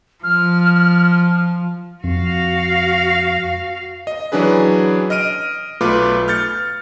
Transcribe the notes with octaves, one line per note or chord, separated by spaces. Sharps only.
F3 F6
F2 F#4 F5
D#5
E3 F#3 C#4 D4 G#4 B4
D#5 F6 D7 D#7
B1 A3 F4 B4 D6
F6 G6 A6 C#7